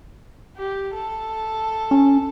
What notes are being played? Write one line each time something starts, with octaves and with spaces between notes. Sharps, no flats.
G4
A4
C#4